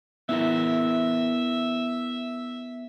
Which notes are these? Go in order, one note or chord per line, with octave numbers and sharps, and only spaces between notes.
B3 E4 A#4 E5